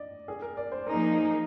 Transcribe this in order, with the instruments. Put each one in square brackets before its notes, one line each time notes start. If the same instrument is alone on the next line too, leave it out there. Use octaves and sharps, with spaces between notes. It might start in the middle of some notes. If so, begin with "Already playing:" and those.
Already playing: [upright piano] D5 D#5
G#4
A#4
D5
C5
[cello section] F3 A#3 D#4 G#4 [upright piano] A#4